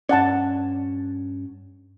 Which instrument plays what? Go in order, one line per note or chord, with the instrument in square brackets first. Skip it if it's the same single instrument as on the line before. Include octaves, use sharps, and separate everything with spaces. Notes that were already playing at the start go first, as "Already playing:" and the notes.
[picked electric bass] G2 C#4 [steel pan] D5 F#5 A5